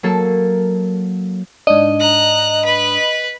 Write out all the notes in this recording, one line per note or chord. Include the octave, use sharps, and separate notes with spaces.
F#3 A#3 A4
G#2 D4 D#5
A#5 F#6
B4 B5